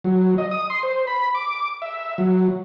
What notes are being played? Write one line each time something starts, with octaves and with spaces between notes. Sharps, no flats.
F#3
D#5
D#6
C6
C5
B5
D6
E5
F#3